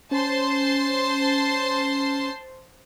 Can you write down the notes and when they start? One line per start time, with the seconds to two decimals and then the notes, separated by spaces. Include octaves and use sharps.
0.11 C#4 C5 A5 C6